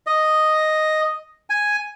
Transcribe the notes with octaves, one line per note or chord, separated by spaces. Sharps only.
D#5
G#5